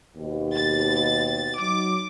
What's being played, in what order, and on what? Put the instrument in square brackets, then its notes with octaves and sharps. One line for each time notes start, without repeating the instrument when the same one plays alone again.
[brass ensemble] D#2 B2
[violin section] A6
[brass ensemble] F#3 D#4 [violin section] D6